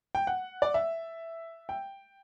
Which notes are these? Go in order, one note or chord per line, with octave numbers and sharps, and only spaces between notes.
G5
F#5
D5
E5
G5